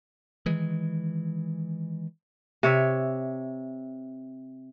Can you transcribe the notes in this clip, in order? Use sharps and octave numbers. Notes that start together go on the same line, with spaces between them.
D#3 E3 G#3
C3 C#5 E5